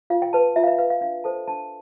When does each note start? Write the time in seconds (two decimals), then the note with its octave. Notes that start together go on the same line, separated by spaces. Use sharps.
0.10 F4 F5
0.22 G5
0.33 B4 A5
0.56 F4 E5
0.64 F5
0.67 E5
0.79 B4 F5
0.90 F5
1.01 D4 F5
1.24 A4 C5 A5
1.48 D4 A5